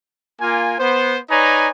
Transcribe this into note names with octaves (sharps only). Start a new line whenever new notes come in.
A#3 F4 G#5
B3 C5
D#4 B4 C#5 D5 G#5 A#5